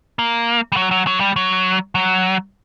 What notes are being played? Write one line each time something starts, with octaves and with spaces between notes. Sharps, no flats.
A#3
G3
F#3
F#3
F#3
G3
F#3
F#3